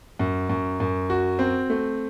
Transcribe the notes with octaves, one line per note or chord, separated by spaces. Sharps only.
F#2
F#2
F#2
F#4
C4
A3